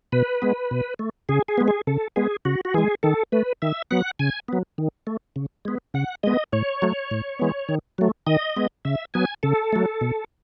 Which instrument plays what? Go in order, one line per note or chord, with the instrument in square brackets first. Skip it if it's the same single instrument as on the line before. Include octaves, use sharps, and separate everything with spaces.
[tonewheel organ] B2 B4
G#3 B3
B2
A3
C#3 G#4
G#4
G#3 B3
G#4
C#3 A4
G#3 B3 G#4
C#3 F#4
F#4
E3 G#3 G#4
D#3 A4
A3 B4
D#3 E5
F#3 B3 F#5
C#3 G#5
F#3 B3
D#3
A3
C#3
G#3 B3
C#3 F#5
G#3 B3 D#5
A2 C#5
F#3 A3
A2
E3 G#3 B3
D#3
F#3 A3
D#3 D#5
G#3 B3
C#3 E5
F#3 B3 G#5
C#3 A4
F#3 A3
B2